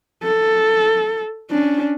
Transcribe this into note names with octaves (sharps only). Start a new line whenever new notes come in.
A4
C#4 D4